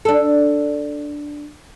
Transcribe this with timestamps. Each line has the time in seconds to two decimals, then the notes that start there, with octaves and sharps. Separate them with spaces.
0.05 D4 A4